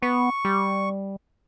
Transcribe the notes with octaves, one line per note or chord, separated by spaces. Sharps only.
B3 C#6
G3